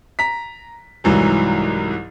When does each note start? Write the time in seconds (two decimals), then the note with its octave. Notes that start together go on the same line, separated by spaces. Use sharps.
0.19 A#5 B6
1.04 C2 G#2 E3 F#3